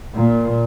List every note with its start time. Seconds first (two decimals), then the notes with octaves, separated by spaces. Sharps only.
0.14 A#2